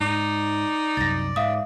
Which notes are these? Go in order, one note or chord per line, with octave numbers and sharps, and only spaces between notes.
G#2 D#4 D5
C2 F#2 A6 A#6
G#2 E5 F5 D#6